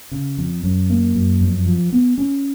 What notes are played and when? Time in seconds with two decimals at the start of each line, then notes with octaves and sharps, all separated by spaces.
0.11 C#3
0.38 F2
0.64 F#2
0.90 A#3
1.15 F#2
1.41 F2
1.66 F3
1.92 B3
2.18 C#4